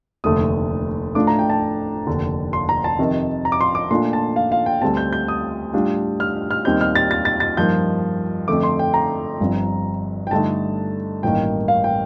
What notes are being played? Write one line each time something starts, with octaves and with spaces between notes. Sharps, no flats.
F1 D#2 D3 A3 D#6
A2 A3 D4 F4 D6
A#5
G5
A5
F1 D#2 D3
C6
A#5
A5
F2 C3 D#3
A#5
D6
C6
D6
A#2 A3 D4 F4 C6
A5
F5
F5
G5
D2 D3 G3 C4 A5
G6
G6
D#6
A2 G3 D4 F4
F6
F6
D#2 D#3 G3 C4 D#4 G6
F6
A6
A6
A6
A6
G2 F3 A#3 D#4 G6
F2 D3 A3 D6
C6
G5
A#5
G1 G2 F3 C4
G5
G2 D3 A3 D#4 A5
A1 G2 D#3 A#3 G5
F5
G5